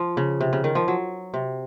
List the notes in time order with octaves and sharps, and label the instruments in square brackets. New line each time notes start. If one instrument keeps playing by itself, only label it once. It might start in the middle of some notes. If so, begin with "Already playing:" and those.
Already playing: [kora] F3
C#3
C3
C#3
D#3
F3
F#3
C3